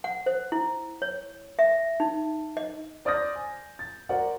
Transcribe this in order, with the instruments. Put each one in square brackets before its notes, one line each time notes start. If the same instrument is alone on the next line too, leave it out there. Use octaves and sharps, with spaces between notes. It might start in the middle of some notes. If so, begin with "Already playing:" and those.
[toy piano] F#5
C5
E4
C#5
E5
D#4
D#5
[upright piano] C5 D5 D#6 F6 G6 A#6
G#5
A6
F#4 A#4 C5 D5 F#5